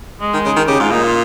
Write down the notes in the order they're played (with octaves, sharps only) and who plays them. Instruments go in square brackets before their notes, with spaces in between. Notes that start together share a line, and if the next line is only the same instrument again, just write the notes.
[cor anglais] G#3
[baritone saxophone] D#3
C#3
D#3
[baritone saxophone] C#3 [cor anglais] G4
[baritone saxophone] G#2 [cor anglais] F4
[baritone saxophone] A#2 [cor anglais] D#4
[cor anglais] F4